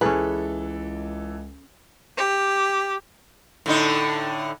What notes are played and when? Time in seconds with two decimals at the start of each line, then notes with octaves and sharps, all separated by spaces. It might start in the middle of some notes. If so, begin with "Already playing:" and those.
0.01 C#2 E3 C#4 G#4 A4 B4
2.18 G4
3.66 A2 D3 D#4